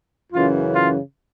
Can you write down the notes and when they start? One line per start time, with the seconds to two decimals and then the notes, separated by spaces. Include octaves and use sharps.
0.33 F#2 C#3 E3 F4
0.74 F4